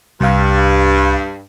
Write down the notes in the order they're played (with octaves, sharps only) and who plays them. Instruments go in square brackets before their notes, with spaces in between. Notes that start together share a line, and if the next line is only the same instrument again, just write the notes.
[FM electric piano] C2 F5 [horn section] G2